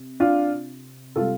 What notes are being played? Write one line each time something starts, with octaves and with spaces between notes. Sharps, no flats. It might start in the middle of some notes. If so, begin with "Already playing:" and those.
Already playing: C3
D4 F4
C3 G3 F4 A4